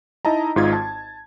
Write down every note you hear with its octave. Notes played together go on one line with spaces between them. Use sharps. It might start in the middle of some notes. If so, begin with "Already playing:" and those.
D#4 E4 D#5 A5 A#5
G#1 G#2 D#4 F4 D#5 G#6
A5